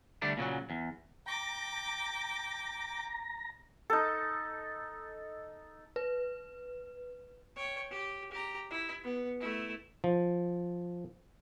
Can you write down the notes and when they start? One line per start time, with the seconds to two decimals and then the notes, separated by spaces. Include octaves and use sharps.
0.22 D3 G3 A3 D4
0.37 A#2 C#3 E3 F#3
0.70 E2
1.26 G5 A#5 D6
3.90 D#4 A4
5.96 B4
7.56 C#5 G5
7.91 G4
8.32 G4 A#5
8.71 E4
9.04 B3
9.41 A3 E4
10.04 F3